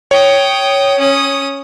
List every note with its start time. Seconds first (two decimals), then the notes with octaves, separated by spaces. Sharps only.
0.11 C#5 G5 D#6
0.99 C#4 D#6